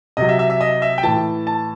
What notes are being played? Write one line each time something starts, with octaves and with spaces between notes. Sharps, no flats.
C3 F#3 D#5
E5
E5
E5
D#5
E5
G5
A2 E3 A5
A5